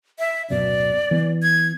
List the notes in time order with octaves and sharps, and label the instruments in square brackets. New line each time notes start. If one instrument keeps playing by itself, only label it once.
[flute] E5
[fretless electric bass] D1 F#2 B2 [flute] D5
[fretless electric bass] E3 B3
[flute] G#6